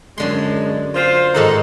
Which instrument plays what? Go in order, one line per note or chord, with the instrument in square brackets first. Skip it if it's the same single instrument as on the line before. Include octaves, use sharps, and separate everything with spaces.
[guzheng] F#2 D3 C6 [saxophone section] G#3
[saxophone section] F4 C5
[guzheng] G#2 D#3 F#5 [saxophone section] D#4 A4